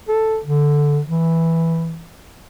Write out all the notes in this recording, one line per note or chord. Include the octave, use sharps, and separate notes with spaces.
A4
D3
E3